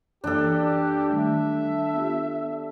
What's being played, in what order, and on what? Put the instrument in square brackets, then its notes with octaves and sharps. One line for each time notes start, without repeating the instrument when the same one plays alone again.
[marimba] F#2 E3 A#3 [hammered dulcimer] D4 A4 [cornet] G4
[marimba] D#3 G3 A3 [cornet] E5
[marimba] B3 F4 G4